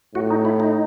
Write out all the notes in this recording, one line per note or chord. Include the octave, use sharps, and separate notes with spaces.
A2 F#4
D#4
E4
D#4